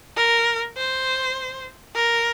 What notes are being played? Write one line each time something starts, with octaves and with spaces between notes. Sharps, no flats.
A#4
C5
A#4